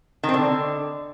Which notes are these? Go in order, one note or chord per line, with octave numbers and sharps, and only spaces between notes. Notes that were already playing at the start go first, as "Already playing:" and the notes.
D#3
C4
D3